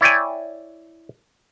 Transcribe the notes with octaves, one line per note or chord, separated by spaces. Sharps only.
E4 C#5 D5 G5 G#5